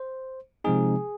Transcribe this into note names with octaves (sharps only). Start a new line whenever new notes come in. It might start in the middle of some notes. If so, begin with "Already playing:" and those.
Already playing: C5
C3 F3 G#3 C4 D#4 G#4